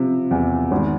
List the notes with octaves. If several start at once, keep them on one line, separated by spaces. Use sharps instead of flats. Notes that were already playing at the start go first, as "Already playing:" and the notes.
Already playing: C3 F3
E2
G#1